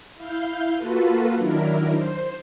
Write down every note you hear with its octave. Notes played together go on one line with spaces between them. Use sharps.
E4 F5 G6
A#3 F4 F#4 A4 B4
D#3 F#3 D4 E4 A#4
C5